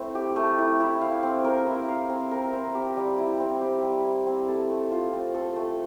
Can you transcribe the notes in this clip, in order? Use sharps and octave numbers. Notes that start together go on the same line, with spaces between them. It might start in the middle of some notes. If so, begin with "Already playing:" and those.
Already playing: A3 C4 E4
G4
A3
E4
E4
F5
C4
A#4
E4
F5
C4
A#4
C4
G4
G3
E4
C4
G4
G3
E4
C4
A4
A3
F4
C4
A4
A3